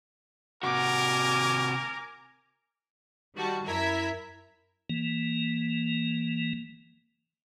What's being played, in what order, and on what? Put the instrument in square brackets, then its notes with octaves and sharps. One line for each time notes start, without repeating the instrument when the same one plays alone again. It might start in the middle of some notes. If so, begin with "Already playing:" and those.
[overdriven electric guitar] C3 F#4 [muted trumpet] A#4 [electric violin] G#5 D6
[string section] D#3 G3 F#4 A5 C#7
F#2 E4 A#4 E5 G#6 B6
[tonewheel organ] E3 A#3